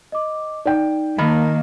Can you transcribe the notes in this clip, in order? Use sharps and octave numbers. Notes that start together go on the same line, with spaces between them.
D#5 D6
D#4 D5 G5
D#3 A#3 A5 B5